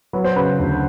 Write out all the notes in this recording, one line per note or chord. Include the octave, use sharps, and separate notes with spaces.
F#3 B4
C5
C#3 B4
D2